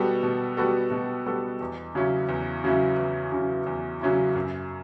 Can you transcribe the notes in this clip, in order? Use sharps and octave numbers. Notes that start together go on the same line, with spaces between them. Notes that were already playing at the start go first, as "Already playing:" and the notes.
Already playing: B2 G3 B3 F#4 A4
B2
G3 B3 F#4 A4
B2
G3 B3 F#4 A4
E2
C#3 F#3 C#4 E4
E2
C#3 F#3 C#4 E4
E2
C#3 F#3 C#4 E4
E2
C#3 F#3 C#4 E4
F#2